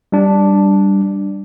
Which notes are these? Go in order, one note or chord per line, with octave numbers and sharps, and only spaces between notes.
G3 D4